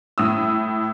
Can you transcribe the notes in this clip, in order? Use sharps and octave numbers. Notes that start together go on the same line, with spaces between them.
A2 D#6 E6